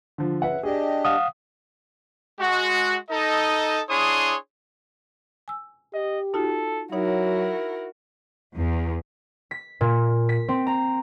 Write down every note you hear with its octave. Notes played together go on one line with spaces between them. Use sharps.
D3 F3
C#3 B4 E5 F#5
D4 G4 G#4 D5 D#5
F5 F#5 D#6
G#3 F#4
D#4 A4 D#5
D4 E4 G#4 C#5 C6 D#6
G#5 E6
G4 D#5
D#4 F4 F#4 A4
F#3 D#4 E4 F#4 A#4 C#5 F#5
E2
B6
A#2
B6
C4
A#5